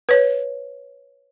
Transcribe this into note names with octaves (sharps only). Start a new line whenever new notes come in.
B4 C#5